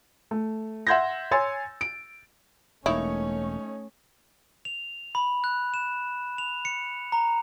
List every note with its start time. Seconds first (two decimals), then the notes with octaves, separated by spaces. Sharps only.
0.31 A3
0.87 E5 F#5 C6 G6 G#6 A#6
1.31 C#5 G#5 C6 E6 A6
1.81 D7
2.86 E1 A3 A#3 C#4 D#4 E4 C#5 C#6
4.65 F7
5.15 B5
5.44 F#6
5.74 E7
6.38 F7
6.65 C#7
7.12 A#5